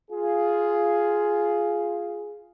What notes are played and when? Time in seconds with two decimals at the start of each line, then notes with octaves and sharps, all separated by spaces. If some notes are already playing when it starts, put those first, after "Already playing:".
0.10 F4 G#4